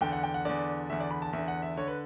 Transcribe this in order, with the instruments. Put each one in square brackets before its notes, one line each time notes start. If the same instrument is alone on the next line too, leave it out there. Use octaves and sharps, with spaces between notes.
[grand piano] E2 D3 G5
F#5
G5
F#5
E2 D3 D5
E2 D3 E5
D5
B5
A5
E2 D3 E5
F#5
E5
D3 C#5
B4